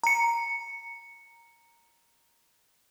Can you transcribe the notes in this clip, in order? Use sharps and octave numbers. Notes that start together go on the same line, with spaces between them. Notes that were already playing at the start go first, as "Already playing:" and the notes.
A#5 C#7